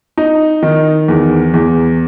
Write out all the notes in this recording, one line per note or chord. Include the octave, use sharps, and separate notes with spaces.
D#4
D#3
E2
E2